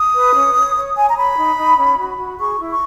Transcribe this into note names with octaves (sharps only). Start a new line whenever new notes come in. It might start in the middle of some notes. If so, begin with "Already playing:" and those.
Already playing: D#6
B4
C#4
C#5
C#5
C#5 G#5
A#5
C#5 B5
D#4
D#4
C#4
F#4
F#4
G#4 C#6
E4
C#6